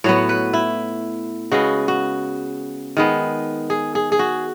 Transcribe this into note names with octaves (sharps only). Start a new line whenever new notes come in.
A2 F#3 B3 C#5
B4
E4
C#3 G#3 B3 F#4
F#4
D#3 G#3 B3
G#4
G#4
G#4
F#4